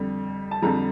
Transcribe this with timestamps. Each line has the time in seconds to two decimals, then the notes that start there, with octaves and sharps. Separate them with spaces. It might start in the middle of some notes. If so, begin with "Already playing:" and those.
Already playing: F2 D3 G3
0.51 A5
0.62 F2 D3 G3 A#5